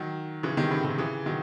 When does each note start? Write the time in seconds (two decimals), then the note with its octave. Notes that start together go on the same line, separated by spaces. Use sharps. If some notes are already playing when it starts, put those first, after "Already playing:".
Already playing: D#3 F#3
0.43 C#3 E3
0.57 C3 D#3
0.71 A2 C#3
0.85 C3 D#3
0.98 C#3 E3
1.26 D#3 F#3